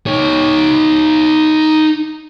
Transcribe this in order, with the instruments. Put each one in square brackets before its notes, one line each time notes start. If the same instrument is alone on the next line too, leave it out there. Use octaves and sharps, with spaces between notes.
[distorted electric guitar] D#4 C#5